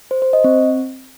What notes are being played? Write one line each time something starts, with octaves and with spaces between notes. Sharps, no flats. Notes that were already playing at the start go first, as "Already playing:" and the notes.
C5
C5
D#5
C4